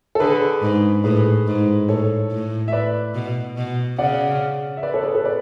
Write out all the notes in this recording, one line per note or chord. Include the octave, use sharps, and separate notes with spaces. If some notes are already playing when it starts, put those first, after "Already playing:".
A4
D3 G#4 B4
G#2
A2 G#4 B4
G#2
A2 A4 C#5
A2
E5
B4 D5
B2
B2
C#3 D5 F#5
E5
B4 D5
A4 C#5
G#4 B4
A4 C#5
B4 D5